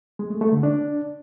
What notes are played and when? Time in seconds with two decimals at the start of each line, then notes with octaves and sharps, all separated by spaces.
0.19 G#3
0.30 A3
0.41 A3
0.52 D3
0.63 D4